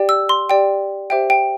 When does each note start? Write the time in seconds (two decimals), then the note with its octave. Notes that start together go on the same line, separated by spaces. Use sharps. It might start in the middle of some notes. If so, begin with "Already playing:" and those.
Already playing: G4 D5 G5
0.09 E6
0.29 C6
0.49 G4 D5 G5
1.10 G4 C5 E5 G5
1.30 G5